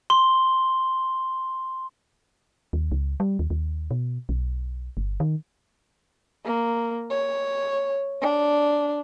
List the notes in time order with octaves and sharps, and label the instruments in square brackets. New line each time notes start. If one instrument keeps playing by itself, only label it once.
[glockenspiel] C6 G7
[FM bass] D#2
C#2
G3
D#2
D#2
B2
B1
G1
D#3
[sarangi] A#3
C#5
D4